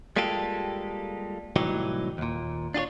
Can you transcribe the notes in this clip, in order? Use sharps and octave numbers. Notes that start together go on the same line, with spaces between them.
G3 G#3 A#3 F4 G4 A4
C2 A2 E3 F#3 D#4 G4
D#2 A#2
D4 F4 G4 C#5